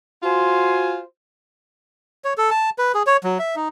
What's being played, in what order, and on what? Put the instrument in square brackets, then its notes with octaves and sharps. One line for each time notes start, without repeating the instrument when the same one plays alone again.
[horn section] F4 F#4 C5 G#5
[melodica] C#5
A4
A5
B4
G#4
C#5
F#3
E5
D#4